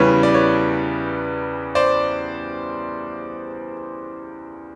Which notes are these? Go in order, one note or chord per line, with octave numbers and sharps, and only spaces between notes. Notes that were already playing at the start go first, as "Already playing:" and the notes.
Already playing: E2 C#3 E3 G3 B4 C#5
D5
B4 C#5
C5 D5